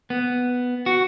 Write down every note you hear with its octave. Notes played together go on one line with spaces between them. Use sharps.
B3
F#4